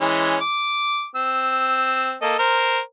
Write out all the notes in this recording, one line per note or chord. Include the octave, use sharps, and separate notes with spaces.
E3 G#3 C#4
D6
C4 E6
A#3 A4 D#5
A#4 C5